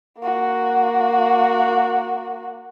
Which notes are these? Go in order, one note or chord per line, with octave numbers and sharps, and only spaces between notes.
A#3 F#4